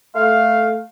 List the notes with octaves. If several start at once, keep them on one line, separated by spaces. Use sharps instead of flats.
A3 F5